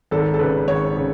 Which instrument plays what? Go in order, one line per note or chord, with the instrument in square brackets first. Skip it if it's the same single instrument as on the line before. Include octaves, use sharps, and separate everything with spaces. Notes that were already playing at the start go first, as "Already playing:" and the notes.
[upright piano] G#1 A4
A4
C#3 B4
G#1 C#5
C#3